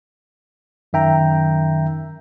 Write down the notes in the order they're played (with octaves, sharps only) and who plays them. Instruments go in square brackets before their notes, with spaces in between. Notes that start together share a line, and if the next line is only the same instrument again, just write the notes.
[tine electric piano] F#2 D#3 E5 G5 A#5